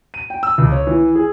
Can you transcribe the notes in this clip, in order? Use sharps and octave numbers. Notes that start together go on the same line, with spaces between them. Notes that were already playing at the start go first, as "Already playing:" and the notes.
D#7
G5
E6
C#2
C#5
E3
G#4